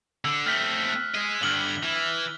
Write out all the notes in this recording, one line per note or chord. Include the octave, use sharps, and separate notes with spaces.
D3 E6
A3 C4 F6 B6
F#6
G#4 D#5
G2 D3 F6 F#7 G7
E3